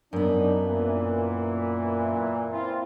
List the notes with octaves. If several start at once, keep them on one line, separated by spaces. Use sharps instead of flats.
F#2 B3 D4 D#4
A#2 E3
C4 E4 F4